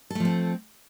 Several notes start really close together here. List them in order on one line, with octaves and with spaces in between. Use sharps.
A4 A3 F3 C4